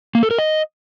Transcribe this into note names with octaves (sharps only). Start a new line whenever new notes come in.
A#3
A4
A#4
D#5